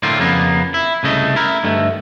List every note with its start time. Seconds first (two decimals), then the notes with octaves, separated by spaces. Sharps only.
0.03 A2 D3 A#3 C4 F4
0.18 F2 C#3 A#3 B3
0.74 E4
1.03 C2 C#3 A3 D#5
1.36 E4 A#4
1.64 G2 D3 D#3 A3